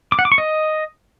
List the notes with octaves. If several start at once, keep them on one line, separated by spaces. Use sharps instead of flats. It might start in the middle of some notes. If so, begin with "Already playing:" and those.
D6
F#5
D6
C#6
D#5